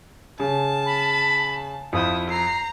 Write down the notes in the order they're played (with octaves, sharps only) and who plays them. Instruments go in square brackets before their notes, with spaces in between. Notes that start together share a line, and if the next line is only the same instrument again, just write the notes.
[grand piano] C#3 [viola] A5
[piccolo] B5
[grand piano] F2 F5 G6 [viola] E4 [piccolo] D#6
[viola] A#5 [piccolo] C7